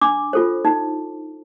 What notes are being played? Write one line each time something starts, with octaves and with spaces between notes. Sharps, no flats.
D4 D6
F4 A4 C5
D#4